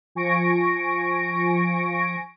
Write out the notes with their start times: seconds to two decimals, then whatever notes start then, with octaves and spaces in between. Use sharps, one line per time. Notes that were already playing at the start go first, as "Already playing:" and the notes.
0.15 F3 G#5 C#6 A#6 D7